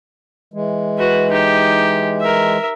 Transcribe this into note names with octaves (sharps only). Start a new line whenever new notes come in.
E3 G#3
F#4 B4
D#4 G4
A#4 E5